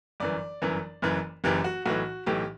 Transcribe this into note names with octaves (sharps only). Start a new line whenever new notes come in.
G1 F#2 E3 D5
G1 F#2 E3
F#1 F#2 E3
F#1 F#2 E3 G4
F#4
B1 A2 E3 F#4
B1 A2 E3 G4